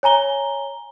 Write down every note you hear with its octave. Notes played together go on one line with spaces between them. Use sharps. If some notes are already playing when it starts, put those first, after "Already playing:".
C#5 G#5 A#5 G7